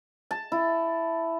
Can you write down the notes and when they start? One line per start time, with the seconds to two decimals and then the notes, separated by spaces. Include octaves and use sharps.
0.31 A5
0.52 E4